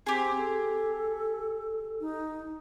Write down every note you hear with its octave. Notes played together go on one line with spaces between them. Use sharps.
C4 G4 G#4
A4
D#4